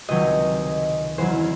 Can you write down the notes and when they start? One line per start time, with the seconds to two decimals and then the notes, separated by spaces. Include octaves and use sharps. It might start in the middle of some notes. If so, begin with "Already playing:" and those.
0.08 C#2 C3 D#3 F#3 D#5
1.18 E2 C#3 F#3 C5